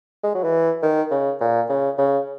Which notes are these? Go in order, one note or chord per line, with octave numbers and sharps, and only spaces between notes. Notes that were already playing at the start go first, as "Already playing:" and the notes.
G#3
F#3
E3
D#3
C#3
A#2
C#3
C#3